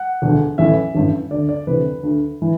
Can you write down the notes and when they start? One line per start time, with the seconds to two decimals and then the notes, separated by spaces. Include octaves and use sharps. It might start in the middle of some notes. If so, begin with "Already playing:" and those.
Already playing: F#5
0.22 E1 D2 D3
0.58 A1 A2 E3 E5
0.95 A1 G2 E3
1.31 D2 D3 D5
1.49 D5
1.67 D2 C3 E3 B4
2.03 D2 D3
2.42 E3